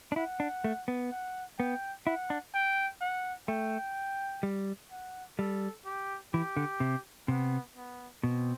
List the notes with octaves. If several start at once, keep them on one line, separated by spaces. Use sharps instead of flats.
D4
E4 F#5
D4
A3
B3
F#5
B3 G5
E4 F#5
D4
G5
F#5
A3 G5
G3
F#5
G3 A4
G4
E3 G4
D3
C3
C3 B3
B3
B2 C4